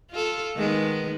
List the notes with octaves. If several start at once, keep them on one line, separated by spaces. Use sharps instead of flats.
F4 A4
D#3 G#3 B3